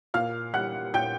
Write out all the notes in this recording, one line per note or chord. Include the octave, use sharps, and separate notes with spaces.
A#2 F5 F6
G3 F#5 F#6
A#2 G5 G6